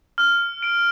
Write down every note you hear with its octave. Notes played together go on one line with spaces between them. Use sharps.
F6
D7